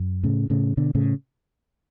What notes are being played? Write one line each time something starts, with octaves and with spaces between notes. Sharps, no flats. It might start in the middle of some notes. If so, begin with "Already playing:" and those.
Already playing: F#2
A2 C#3
A2 C#3
B2 D3
A2 C#3